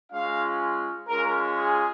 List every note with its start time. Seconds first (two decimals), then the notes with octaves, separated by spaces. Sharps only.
0.12 G#3 C#4 F4 F5
1.08 G#3 C#4 F4 A#4
1.56 G#4